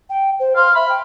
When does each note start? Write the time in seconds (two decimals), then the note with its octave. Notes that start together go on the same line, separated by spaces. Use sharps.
0.10 G5
0.39 C5
0.56 F5 C6
0.75 E5 B5
0.89 G5